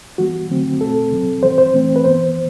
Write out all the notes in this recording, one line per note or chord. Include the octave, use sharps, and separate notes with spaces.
E3 G3 B3 F#4
D3 F#3 A3 C4
B2 A3 C4 A4
C3 F#3 C4
E3 G3 C4 C5
C5
E3 A3 C4
B4
E3 B3 C5